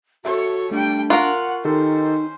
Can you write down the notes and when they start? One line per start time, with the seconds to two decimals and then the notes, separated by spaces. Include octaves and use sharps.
0.25 F#4 A4 C#5 E5
0.71 G3 A3 D4 G5
1.10 F4 A#4 F#5 C#6 F#6
1.65 D#3 C#4 D#4 G4 A4 C5